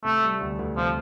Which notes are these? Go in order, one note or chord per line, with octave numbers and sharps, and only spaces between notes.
C3 A3
G3
D2
D2
C3 F3